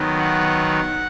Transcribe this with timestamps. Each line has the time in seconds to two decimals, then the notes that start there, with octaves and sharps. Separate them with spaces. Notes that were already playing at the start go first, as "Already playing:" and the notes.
Already playing: D#3 F#3 B3 D#4
0.20 F#5